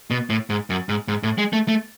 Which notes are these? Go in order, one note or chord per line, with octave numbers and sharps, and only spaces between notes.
B2
A2
G#2
F#2
G#2
G#2
A2
G#3
A3
A3